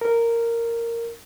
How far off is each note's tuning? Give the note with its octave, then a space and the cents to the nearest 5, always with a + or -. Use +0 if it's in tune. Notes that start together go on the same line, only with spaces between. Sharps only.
A#4 -10